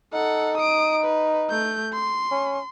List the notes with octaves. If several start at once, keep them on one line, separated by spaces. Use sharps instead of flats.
D#4 A4 F#5
D#6 D7
B4
A3 G6
C6
C#4